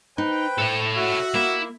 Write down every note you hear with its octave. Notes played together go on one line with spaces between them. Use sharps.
D#4 B4 C5 G5
A2 A4 C#5
F#4 E5
A#3 E4